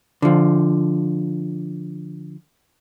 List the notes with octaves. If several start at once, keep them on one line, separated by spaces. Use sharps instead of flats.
D3 F3